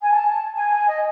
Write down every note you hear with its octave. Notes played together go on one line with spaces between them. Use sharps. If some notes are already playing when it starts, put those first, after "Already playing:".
G#5
A5
G#5
D#5